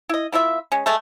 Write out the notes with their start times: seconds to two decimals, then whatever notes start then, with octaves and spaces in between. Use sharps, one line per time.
0.09 E4 D#5
0.32 A#3 E4 F4 E5
0.72 G#3 C#4
0.86 G#3 A3 A4